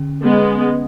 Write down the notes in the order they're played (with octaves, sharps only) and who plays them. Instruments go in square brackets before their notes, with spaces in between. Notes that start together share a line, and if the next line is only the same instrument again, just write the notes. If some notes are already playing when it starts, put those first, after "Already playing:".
Already playing: [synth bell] D3 C#4
[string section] G#3 B3